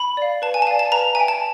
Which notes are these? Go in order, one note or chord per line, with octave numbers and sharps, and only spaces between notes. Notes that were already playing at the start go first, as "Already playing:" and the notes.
Already playing: B5
D5 F5
B4 A5
G#5
A5
D5 F5 G#5
A5
B4 A#5
E5 G5 G#5
A5